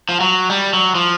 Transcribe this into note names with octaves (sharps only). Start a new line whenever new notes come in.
F3
F#3
G3
F#3
F3